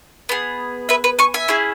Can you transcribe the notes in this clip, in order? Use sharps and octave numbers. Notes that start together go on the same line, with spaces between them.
B3 G#4
B4 E5
B4
G#5 C#6
E5 G#5
C#4 E4 G#4